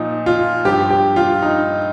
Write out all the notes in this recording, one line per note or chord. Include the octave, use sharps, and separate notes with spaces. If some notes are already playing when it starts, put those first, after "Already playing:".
Already playing: A#2 F3 D#4
F4
G2 F3 G4
G4
F4
D#4